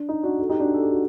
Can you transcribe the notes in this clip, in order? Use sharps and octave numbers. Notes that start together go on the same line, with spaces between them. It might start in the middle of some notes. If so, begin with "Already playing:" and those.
Already playing: D4
D#4
D4 F#4
F#4 A4
D#4 G4
D4 F#4
A4
G4
F#4